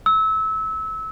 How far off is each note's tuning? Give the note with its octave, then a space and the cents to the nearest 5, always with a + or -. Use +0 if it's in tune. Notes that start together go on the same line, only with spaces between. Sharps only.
E6 -25